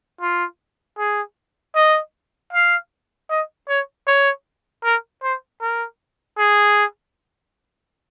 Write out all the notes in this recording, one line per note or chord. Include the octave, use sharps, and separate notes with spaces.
F4
G#4
D#5
F5
D#5
C#5
C#5
A#4
C5
A#4
G#4